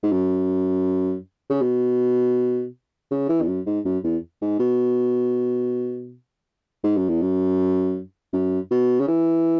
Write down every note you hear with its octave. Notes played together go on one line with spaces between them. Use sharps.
G#2
F#2
C#3
B2
C#3
E3
E2
F#2
G#2
F#2
E2
G#2
B2
G#2
F#2
E2
F#2
F#2
B2
C#3
E3